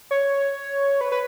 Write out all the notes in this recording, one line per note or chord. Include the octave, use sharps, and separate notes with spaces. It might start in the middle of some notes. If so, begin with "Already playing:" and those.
C#5
B4
B4